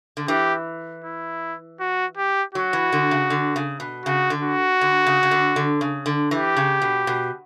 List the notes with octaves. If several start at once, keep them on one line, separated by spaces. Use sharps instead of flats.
D3
E3 G4
E4
F#4
G4
F#3 F#4
E3
D3
C#3
D3
C#3
B2
C#3 F#4
D3
F#4
D3
C#3
C#3
D3
D3
C#3
D3
E3 G4
C#3
B2
B2